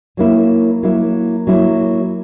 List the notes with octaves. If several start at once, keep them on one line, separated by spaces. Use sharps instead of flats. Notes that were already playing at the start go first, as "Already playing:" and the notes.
F#3 A#3 E4
F#3 A#3 E4
F#3 A#3 E4